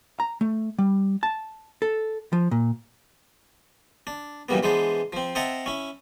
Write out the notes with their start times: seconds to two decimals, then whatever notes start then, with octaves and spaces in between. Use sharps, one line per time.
0.20 A#5
0.41 A3
0.78 G3
1.23 A5
1.82 A4
2.33 F3
2.51 A#2
4.07 D4
4.49 F#2 A#2 E3 G3 A#3 B3
4.63 E3 G#3 B3 D4 C5
5.13 F3 C4
5.35 C4 D#5 E5 F#5 A5 A#5
5.66 C#4 E4